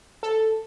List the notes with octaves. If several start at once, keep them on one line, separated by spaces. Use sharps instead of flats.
A4